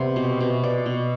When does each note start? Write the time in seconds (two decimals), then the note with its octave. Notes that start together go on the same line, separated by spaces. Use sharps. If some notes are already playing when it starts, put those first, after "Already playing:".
Already playing: C3 B3 C5 D5
0.16 B2
0.40 B2
0.63 B2 D5
0.86 B2